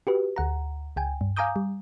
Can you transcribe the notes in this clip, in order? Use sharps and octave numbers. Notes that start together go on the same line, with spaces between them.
F#4 G4 B4
D2 F#5 A#5
C#2 G5 G#5
G2
F5 G#5 A#5 D6 D#6 G6
G3